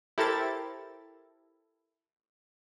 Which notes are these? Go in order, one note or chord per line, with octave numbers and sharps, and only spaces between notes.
E4 G4 A4 A#4 C5 A6